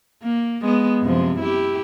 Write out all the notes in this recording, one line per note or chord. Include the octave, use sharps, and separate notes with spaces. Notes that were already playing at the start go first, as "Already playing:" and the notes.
A#3
G#3 B3
F#2 C3 F3
E4 G4